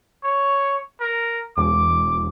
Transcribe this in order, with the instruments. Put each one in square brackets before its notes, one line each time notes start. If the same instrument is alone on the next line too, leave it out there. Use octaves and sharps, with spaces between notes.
[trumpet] C#5
A#4
[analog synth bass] E1 [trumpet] D6